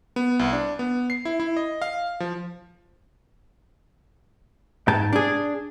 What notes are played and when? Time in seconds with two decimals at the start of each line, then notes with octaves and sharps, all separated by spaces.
0.16 B3
0.39 C2
0.53 D4
0.79 B3
1.10 C7
1.25 E4
1.40 E4
1.57 D#5
1.82 F5
2.20 F3
4.88 G#2 G5 A5
5.13 D4 G#4